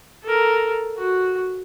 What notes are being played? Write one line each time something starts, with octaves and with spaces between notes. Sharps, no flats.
A4 A#4
F#4